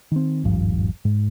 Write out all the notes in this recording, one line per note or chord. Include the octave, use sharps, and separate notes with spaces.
D#3 C4
D#1 G#1 G2 F3
G#2